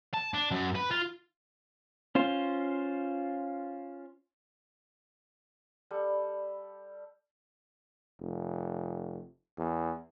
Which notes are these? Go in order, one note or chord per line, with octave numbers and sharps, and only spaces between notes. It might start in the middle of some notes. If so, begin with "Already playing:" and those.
A5
D4
F#2
B4
F4
C#4 F4 C5
G3 A4
F1
E2